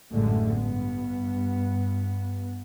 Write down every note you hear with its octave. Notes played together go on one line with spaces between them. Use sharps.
A1 F#2 D3 G#3 A3
G2 B3